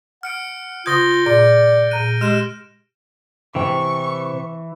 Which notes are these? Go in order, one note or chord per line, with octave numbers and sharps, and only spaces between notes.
F#5 F6 C#7 D7
C#3 F4 D#6 G6 G#6 A#6 G7
A#2 D5 D7
A#2 A#5 F#6 D#7
G#3 G4 F6 E7
C3 E3 G5 C#6